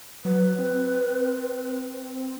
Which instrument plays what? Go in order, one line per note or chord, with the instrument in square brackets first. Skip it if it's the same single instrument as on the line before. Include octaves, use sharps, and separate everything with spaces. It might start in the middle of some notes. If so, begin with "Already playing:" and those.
[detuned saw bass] F#3 [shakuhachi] B4
[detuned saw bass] C4